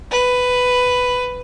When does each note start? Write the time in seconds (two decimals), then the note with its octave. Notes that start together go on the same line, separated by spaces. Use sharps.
0.11 B4